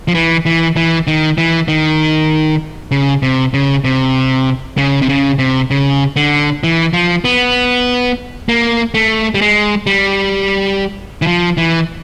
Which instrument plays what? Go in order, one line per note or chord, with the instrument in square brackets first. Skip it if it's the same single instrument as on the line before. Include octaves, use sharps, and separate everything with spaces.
[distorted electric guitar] F3
E3
E3
E3
D#3
E3
D#3
C#3
C3
C#3
C3
C#3
C3
C#3
C3
C#3
D3
E3
F3
B3
A#3
A3
G3
G#3
G3
E3
F3
E3